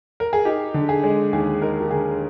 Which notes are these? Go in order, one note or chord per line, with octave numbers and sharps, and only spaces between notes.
A#4
G#4
D#4 G4
D3
G#4
G#3
D#2 G#4
D#4 A#4
G4
D3 G#4